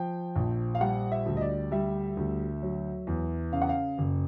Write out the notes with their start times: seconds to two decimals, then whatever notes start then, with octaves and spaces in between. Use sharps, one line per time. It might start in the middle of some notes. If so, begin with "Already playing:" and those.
Already playing: F3 G5
0.36 A#1
0.75 F5
0.80 G3 F#5
1.12 E5
1.26 D2
1.37 D#5
1.41 D5
1.72 G3 E5
2.17 D2
2.63 F#3
3.07 E2
3.52 C#3 F5
3.62 F#5
3.69 F5
3.98 F#1